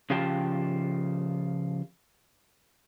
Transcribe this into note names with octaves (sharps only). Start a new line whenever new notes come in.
C#3 F3 G4 F5 G5 A5